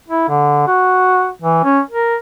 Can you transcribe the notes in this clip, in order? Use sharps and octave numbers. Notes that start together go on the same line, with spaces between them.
E4
D3
F#4
E3
C#4
A#4